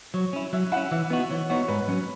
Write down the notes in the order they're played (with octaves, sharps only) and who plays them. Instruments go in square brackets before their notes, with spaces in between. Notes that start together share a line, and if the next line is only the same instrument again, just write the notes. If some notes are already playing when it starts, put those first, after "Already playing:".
[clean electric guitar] F#3 [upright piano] C#5
[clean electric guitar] C#4 E4
[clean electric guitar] F#3 [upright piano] E5
[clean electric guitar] C#4 E4 [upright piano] F#5
[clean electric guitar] E3 [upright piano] E5
[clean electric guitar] B3 D#4 F#4
[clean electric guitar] E3 [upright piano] C#5
[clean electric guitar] B3 D#4 F#4 [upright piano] C#5
[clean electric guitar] G#2 [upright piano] B4
[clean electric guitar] F#3 C#4